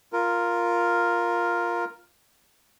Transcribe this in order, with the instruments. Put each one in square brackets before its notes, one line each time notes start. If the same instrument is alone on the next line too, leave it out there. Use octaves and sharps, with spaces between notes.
[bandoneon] F4 A#4